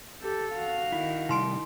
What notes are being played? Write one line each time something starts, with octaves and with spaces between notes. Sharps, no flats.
G4 A4
F#4 F5
D#3 E4
C3 G3 A3 E4 C6 D7